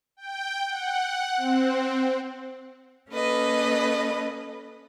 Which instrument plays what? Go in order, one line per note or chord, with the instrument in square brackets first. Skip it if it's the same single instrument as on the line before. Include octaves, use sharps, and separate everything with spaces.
[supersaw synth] G5
F#5
C4
[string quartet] A#3 C#4 A4 B4 D#5